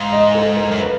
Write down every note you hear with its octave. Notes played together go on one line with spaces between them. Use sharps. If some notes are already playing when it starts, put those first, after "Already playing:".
Already playing: G#2 F5
D#5
A4
A#4
F#2
B4